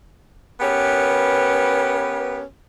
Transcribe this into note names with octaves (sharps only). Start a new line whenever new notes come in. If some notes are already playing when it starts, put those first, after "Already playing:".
B3 C#4 G4 A#4 B4